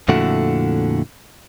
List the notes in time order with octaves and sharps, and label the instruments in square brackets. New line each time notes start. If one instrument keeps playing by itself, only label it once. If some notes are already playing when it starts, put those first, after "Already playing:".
[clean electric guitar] F2 A#2 D3 A3 E4 F#4